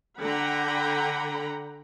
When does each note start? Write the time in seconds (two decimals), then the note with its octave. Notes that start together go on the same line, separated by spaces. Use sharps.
0.20 D3 F#5 G5 A#5 B5